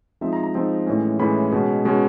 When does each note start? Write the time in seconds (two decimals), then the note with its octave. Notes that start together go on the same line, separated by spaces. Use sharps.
0.21 F3 G#3 C4 D#4 E5
0.33 A#5
0.43 A#5
0.54 F3 G#3 C4 D#4
0.86 A2 E3 G#3 C#4
1.19 A2 E3 G#3 C#4 B5
1.52 B2 G#3 C#4
1.85 B2 G#3 C#4